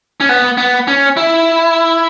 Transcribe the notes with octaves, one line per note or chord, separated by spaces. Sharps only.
C#4
B3
B3
C#4
E4